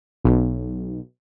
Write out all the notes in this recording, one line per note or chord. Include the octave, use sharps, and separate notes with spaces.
B1